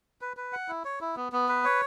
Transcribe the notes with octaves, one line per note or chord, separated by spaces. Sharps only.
B4
B4
F#5
E4
C#5
E4
B3
B3
B4
C#5